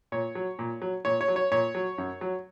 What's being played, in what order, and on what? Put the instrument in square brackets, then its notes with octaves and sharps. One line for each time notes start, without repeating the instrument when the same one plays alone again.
[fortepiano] A#2 C#5
F#3
A#2
F#3
A#2 C#5
C#5
F#3
C#5
A#2 C#5
F#3
F#2
F#3